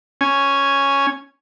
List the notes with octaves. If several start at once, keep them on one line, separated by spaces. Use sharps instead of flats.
C#4 G#5